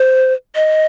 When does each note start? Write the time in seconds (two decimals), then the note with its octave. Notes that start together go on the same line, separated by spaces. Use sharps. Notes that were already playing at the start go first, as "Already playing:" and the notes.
Already playing: C5
0.55 D#5